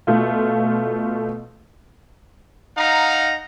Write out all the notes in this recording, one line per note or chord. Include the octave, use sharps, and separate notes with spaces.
B2 A3 F4
D#4 F5 F#5 A#5